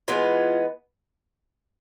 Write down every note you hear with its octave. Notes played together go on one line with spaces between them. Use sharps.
E3 G#3 B3 F4